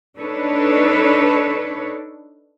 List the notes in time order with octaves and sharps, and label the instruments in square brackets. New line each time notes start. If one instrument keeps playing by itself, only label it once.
[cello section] D4 D#4 A4 B4 C#5